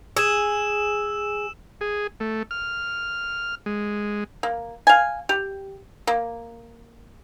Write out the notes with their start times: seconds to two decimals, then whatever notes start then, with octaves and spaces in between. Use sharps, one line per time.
0.17 G#4 E6 E7
1.81 G#4
2.20 A3
2.51 F6
3.66 G#3
4.43 A#3
4.87 F5 G#5
5.29 G4
6.07 A#3